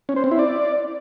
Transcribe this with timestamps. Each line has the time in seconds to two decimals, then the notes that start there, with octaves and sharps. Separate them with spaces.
0.09 C#4
0.16 C5
0.24 C4
0.31 E4
0.39 D5